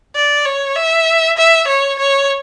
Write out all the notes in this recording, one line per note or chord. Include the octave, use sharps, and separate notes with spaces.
D5
C#5
E5
E5
C#5
C#5